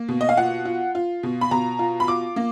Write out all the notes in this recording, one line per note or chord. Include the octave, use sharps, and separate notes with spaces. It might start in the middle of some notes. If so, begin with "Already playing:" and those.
Already playing: A#3
B2
D#5
F5
F4 F#5
F4
F4
B2
B5
B2 A#5
F4
B5
F4 D6
A#3